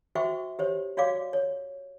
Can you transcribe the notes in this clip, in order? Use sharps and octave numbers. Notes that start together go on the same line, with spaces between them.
F#4 C5 E5 G5 C#6 D6
G4 C5 C#5
F#4 C#5 D5 F5 D6
C#5